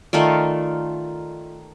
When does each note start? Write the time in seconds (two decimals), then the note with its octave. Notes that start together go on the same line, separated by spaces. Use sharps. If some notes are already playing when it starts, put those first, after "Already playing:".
0.13 D#3 A3 F4 D5